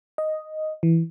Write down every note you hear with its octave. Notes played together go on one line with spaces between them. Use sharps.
D#5
E3